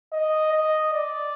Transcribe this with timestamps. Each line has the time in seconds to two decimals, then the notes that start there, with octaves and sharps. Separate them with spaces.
0.12 D#5
0.52 D#5
0.93 D5